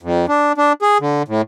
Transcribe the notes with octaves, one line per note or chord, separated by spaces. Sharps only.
F2
D4
D4
G#4
D3
A2